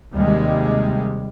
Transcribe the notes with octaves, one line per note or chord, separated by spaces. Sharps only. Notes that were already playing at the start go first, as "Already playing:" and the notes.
D#2 C3 G3 G#3